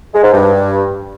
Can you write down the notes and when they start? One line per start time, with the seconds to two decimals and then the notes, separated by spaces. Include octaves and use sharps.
0.14 G#3
0.23 G#2
0.33 G2